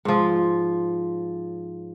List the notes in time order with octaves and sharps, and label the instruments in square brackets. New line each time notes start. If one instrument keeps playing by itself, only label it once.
[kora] G#2 F3